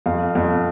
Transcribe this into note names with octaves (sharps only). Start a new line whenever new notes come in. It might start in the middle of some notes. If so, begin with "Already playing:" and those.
F2 F5
F2 F5